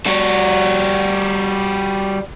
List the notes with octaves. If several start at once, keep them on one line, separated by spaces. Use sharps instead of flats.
G3 F#4